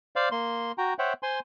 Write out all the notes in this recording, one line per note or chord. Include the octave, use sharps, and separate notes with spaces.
C5 D5 F5
A#3 C6
F#4 G5 A#5
C5 C#5 E5 F#5 G5
C5 G#5 C6